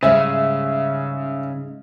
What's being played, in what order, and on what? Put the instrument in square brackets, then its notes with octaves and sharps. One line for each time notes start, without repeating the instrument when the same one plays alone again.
[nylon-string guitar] G#2 G3 G#3 [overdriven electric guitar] C#3 [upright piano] E5